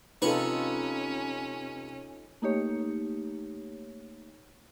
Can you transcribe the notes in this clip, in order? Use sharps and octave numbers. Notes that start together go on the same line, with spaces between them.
C3 C#4 D#4 F4 A4 B4 C#6
A3 A#3 D#4 G4 C#5